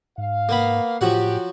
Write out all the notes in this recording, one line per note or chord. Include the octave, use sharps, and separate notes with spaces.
G#2 F5
A#3 B3 B5
A2 F3 F#3 G4 F#5